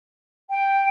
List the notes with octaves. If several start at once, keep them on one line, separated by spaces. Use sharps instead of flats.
G5